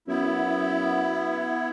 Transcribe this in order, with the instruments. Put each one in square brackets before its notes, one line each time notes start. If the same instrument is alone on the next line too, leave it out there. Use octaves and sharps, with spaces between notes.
[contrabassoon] F#2 [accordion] B3 E4